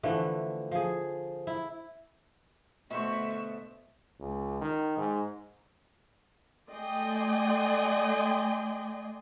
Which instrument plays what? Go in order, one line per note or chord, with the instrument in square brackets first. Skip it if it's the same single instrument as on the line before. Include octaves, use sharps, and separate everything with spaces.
[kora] D3 E3 F3 A3
F3 G#4
E4
[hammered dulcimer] B2 C5 [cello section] D3 A3 [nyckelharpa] F#4 C#6 [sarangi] E5
[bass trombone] C#2
D#3
G#2
[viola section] A3 D5 D#5 G5 G#5 C6